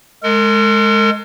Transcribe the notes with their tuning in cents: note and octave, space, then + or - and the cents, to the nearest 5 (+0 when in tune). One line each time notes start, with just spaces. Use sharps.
G#3 +20 A#4 -45